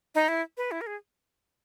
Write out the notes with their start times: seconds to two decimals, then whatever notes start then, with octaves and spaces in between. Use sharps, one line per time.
0.15 D#4
0.28 E4
0.57 B4
0.71 E4
0.81 A#4
0.87 G#4